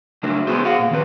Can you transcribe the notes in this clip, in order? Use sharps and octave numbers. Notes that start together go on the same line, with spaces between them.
C#3 F#3 A3 D4 E4 A#4
G#3 B3 E4 F#4 G#4 C5
G#4 F5 F#5
A#2
D#3 F#3 C4 A4 B4